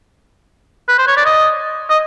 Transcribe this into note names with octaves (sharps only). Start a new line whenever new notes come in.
B4
C5
C#5
D5
D#5
D#5